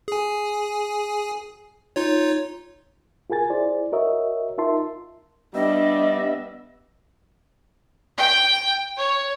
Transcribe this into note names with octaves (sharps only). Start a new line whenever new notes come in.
G#4 G#5
D#4 F4 C#5
F4 G#4 A#4 G#5 A6
E4 G#4 C5 D5
F#4 A#4 C#5 D#5 E5
D#4 F4 A#4 E5 A5 C6
G3 B3 D4 D#5 E5
G5
C#5